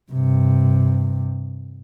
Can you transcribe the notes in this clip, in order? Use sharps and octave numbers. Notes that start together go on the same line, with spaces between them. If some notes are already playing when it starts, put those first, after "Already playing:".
G2 C3